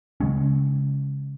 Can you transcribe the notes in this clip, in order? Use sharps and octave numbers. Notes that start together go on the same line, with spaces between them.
C#3 G#3 C#4